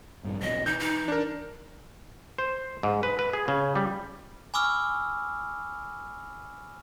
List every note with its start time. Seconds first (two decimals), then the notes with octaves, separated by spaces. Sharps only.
0.24 A#1 G2
0.42 B1 E2 F#3 D#5
0.66 E3 D#4 G6
0.79 D#4
1.08 D4 A#4
2.38 C5
2.83 G#2
3.03 B4
3.19 B4
3.33 G#4
3.48 C#3
3.75 G3
4.54 G#5 B5 C#6 D6 E6 F6